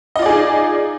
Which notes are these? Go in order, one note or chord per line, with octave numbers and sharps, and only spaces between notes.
D#4 F4 G#4 D5 D#5